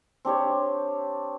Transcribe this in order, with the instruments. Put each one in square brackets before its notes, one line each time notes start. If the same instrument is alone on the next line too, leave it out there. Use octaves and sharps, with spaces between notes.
[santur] C4 D4 G4 C#5